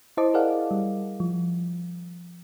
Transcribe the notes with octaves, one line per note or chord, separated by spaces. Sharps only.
E4 C5 D#5 A5 D6
G#4 A#4 D5 F5 F#5
G3
F3